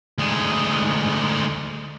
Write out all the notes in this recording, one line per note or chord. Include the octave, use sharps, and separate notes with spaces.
D2 G#3